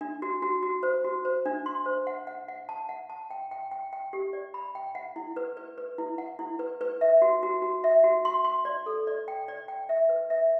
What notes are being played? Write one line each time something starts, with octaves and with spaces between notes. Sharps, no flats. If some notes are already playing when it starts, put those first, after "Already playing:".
D4
F#4
F#4
F#4
C5
F#4
C5
D4
C6
C5
F#5
F#5
F#5
A5
F#5
A5
G5
G5
G5
G5
G4
D5
B5
G5
F#5
E4
B4
B4
B4
E4
F#5
E4
B4
B4
E5
F#4
F#4
F#4
E5
F#4
C6
C6
D5
A4
D5
G5
D5
G5
E5
B4
E5